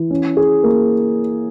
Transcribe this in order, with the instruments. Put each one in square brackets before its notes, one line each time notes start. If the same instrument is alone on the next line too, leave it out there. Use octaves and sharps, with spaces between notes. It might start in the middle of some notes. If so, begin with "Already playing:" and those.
Already playing: [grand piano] E3
C#4
G#4
A#3